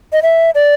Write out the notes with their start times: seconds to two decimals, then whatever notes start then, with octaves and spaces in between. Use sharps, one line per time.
0.13 D#5
0.22 E5
0.55 D5